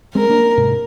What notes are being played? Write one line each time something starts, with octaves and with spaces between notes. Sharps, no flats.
G#3 C4 A#4
A#3 D4
G#2 C3